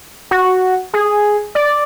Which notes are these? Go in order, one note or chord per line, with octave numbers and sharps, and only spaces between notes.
F#4
G#4
D5